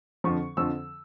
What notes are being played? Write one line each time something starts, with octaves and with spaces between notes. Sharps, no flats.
F2 D3 F3 C#6
F2 D3 F3 E6